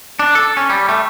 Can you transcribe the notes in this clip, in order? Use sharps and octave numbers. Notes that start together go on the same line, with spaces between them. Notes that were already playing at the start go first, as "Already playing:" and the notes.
D4
A4
C#4
G3
A3